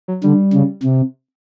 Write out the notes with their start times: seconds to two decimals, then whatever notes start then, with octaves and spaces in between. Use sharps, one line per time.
0.08 F#3
0.24 D3 G3
0.53 C#3
0.83 C3